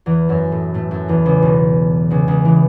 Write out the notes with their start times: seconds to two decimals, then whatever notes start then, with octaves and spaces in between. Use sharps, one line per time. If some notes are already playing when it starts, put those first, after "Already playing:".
0.06 E2 E3
0.29 F#2 F#3
0.51 A2 A3
0.74 A2 A3
0.91 F#2 F#3
1.08 E2 E3
1.26 C#2 C#3
1.42 B1 B2
2.11 C#2 C#3
2.28 C#2 C#3
2.45 E3